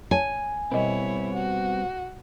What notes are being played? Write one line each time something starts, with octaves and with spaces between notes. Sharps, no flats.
C#5 G#5 A5
B2 G3 B3 C4 E4 C#5 D#5
F#4